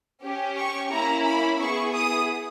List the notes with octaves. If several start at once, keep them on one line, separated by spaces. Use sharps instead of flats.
C#4 G4
C#6
A#3 C#4 E4 A#5
B5
B3 E4 G#4 C#6
D#6